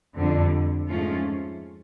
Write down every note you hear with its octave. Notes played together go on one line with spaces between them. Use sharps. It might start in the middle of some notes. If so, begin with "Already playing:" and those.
F2 D3 G3
G#2 F3 A3 C#4 F4